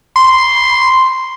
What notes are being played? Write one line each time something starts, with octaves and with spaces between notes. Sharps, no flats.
C6